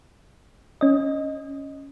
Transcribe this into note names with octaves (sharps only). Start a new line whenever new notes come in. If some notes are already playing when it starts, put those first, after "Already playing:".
C#4 D#5